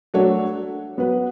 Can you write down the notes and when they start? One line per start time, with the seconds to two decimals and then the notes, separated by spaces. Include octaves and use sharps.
0.14 F#3 A3 D4 F#4 C#5
0.97 F#3 B3 F#4 B4